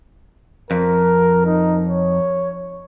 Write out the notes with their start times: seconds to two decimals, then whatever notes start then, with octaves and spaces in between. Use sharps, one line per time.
0.71 F2 A#4
1.46 D#4
1.89 C#5